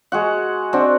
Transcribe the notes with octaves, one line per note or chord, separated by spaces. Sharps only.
G#3 F#4 F#5
C4 D4 F#4